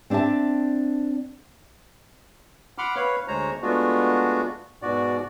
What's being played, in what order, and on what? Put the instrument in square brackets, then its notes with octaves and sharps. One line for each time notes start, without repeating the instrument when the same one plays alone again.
[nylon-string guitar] C4 D4 D5 E5 A5
[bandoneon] F#5 B5 C6 D6 F6
B4 C#5 F5
D2 G#3 C5 C#5 A#5
G#3 A3 B3 D4 F4 F#4
G#2 B2 F#4 D5